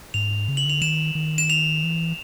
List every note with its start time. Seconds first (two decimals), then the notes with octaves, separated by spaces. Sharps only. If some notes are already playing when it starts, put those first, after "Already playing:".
0.14 G#2 F7
0.48 C#3
0.57 F#7
0.65 D3 F7
0.81 D#3 E7
1.15 D#3
1.38 E7
1.50 F7
1.84 E3